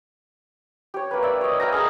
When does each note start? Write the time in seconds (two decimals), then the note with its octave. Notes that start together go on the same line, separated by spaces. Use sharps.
0.94 G4 C#5
1.11 A#3 B4
1.23 D5 E5
1.41 C#5 D#5
1.60 E5 F5 G5 A#5
1.72 G#4 A#4 D#5